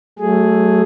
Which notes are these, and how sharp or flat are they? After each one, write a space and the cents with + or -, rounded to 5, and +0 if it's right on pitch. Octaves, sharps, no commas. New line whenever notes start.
F#3 +40 A3 +0 G#4 +0